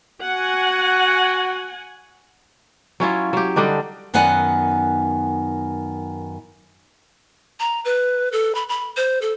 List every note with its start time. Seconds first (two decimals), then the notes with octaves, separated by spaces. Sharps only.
0.21 F#4 F#5 G#5
3.00 F#3 C#4 E4 F4
3.33 F#3 G4
3.56 D3 G3 D4 D#4
4.14 F#2 D#3 B3 D5 F#5 G#5
7.60 A#5
7.85 B4
8.32 A4
8.55 B5
8.69 B5
8.97 C5
9.22 A4